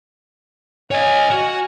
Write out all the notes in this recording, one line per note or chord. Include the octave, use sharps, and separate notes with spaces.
C#5 D#5 G#5 F6
F#4